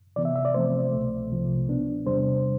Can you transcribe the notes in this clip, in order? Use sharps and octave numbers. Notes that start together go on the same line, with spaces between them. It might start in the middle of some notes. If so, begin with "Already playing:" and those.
C3 E3 B3 D5
E5
E5
D5
C3 F3 A3 C4 C5
C2 B2 A3
C2 C3 F3
B2 B3 D4
E2 C3 G3 D4 C5